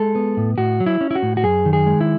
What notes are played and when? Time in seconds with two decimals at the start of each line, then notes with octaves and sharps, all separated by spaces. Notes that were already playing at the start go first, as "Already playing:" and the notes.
Already playing: G#3 A4
0.15 B3
0.37 A2
0.58 A2 F#4
0.80 F#3
0.86 E4
1.01 C#4
1.11 E4
1.15 F#4
1.23 A2
1.37 F#4
1.44 F#2 G#4
1.65 D#3
1.73 G#4
1.86 G#3
2.01 E4